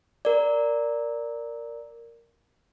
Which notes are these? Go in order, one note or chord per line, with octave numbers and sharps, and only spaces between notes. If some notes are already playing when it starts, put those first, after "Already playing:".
A#4 D5